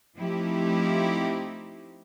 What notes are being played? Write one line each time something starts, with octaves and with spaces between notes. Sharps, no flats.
F3 A3 C4 D#4 E4 G4